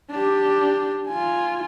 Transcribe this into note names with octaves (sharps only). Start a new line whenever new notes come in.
D4 G4
F4 G#5